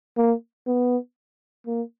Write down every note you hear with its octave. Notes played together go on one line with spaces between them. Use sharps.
A#3
B3
A#3